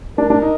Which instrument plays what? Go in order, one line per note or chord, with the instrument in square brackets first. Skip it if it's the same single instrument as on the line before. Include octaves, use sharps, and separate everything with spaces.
[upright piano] D4 [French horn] A#4
[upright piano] D4
D#4